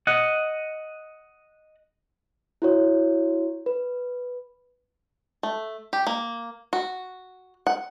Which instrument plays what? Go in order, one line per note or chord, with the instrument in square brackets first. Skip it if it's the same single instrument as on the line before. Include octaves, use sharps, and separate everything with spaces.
[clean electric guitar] D#5 F#5
[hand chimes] E4 F#4 C#5
B4
[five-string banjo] A3
G4
A#3
F#4
F#5